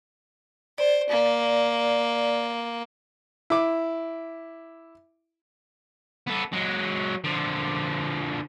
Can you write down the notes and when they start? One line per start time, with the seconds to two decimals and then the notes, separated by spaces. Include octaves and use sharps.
0.78 C5 D5
1.09 A#3
3.50 E4 D6
6.27 B3 A4
6.53 F#3 G#3
7.24 D3 F3